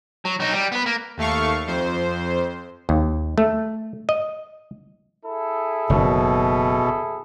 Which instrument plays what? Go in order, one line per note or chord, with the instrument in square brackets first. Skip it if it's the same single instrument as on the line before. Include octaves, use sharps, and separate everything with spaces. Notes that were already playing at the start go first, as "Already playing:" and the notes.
[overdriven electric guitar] F#3
F#3 D#4
G3
B3 B4
A#3
[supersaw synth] D#2 A3 F5 C#6
F2 C5
[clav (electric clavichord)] D#2
A3
D#5
[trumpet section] E4 G#4 A4
[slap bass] F#1 D#3 [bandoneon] B2